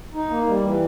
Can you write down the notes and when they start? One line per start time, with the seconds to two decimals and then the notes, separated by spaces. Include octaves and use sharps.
0.14 D#4
0.30 A#3
0.47 G3
0.63 E3